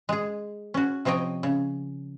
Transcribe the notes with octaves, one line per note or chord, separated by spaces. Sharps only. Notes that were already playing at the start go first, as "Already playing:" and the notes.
G#3 G#4
C#4 F#4
C3 F3 C#5 D#5 G5
C#3